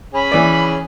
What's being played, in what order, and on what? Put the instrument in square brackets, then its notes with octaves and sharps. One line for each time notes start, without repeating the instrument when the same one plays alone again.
[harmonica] C#4 G#4 [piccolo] B5
[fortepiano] E3 D5